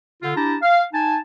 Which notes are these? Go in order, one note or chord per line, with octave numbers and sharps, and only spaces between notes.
D3 F4
D4 E4 G4 A5 A#5
F5
D#4 G#5 A5